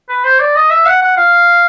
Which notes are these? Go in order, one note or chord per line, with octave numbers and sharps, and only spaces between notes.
B4
C5
D5
D#5
E5
F#5
F#5
F5